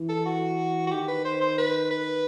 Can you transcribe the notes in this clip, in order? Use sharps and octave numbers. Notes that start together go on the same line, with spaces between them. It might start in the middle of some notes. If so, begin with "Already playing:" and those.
Already playing: E3
A4
F#4
F#4
D#3 G4
B4
C5
C5
B4
B4